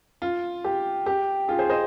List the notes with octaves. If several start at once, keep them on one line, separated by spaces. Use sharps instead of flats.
F4
G4
G4
F4 G#4
G#4 C5
C5 D#5